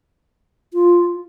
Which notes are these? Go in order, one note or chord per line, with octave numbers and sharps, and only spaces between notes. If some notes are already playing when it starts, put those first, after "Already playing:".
F4